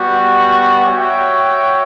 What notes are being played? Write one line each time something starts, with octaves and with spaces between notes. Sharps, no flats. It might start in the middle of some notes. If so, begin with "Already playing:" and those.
Already playing: G3 B3 F#4
F#4 C#5 E5 G5